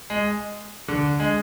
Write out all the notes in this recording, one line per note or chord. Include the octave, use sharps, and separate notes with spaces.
G#3
D3
G#3